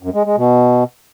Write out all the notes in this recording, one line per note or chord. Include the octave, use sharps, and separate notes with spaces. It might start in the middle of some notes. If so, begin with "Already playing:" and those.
F#2
G#3
G#3
B2